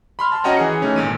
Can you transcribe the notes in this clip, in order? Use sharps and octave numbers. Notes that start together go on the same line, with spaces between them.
B5 C6 F6
A5 C6
C#4 F#4 D#5 F#5 G5 A#5
E3 G#4 C#7
E3 A3 C#4 D#4
G#1 A#2 D#7